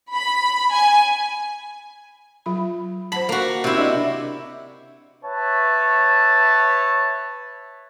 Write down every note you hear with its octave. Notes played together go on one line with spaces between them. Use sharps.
B5
G#5
F#3 F4 B5
C5 F#5 A5 B5
A#3 F#4
C3 E4
D4 D5 D#5
B4 C#5 E5 A5